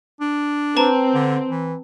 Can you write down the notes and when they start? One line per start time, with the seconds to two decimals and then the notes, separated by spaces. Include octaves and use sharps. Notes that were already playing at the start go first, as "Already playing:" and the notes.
0.20 D4
0.77 C4 B4 A5 A#5
1.14 D3
1.48 E3